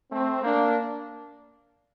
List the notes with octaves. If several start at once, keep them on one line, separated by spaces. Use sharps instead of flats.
A3 C4
A#3 D4